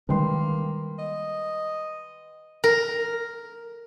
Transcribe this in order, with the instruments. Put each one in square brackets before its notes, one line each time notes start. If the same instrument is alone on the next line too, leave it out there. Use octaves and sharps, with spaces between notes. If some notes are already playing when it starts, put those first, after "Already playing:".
[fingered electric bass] D#3 G3 G#3 [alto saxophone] A#3 [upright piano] B4 G5 C6
[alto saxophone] D#5
[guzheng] A#4